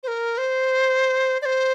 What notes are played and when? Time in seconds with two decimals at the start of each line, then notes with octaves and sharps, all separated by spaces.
0.03 C5
0.08 A#4
0.38 C5
1.42 D5
1.45 C5